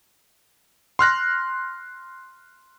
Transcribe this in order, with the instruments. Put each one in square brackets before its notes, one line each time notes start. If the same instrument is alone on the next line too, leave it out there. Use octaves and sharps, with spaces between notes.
[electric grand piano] C6 F6 F#6 A#6